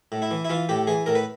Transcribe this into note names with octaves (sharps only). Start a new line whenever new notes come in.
A2
E4
E3
E4
E3 F4
A2 G4
E3 G#4
A2 A#4
B4